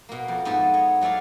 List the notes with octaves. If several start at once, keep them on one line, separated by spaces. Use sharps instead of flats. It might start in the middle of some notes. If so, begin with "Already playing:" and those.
B2 A#3
F2
G#2 B3 A4 E5 A5
C#5 D#5
F#3 A3 E4 D5 F5